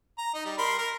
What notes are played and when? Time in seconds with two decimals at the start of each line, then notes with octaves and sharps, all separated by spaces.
0.18 A#5
0.34 D#4
0.45 G3
0.58 A#4 B5 C6
0.78 A#4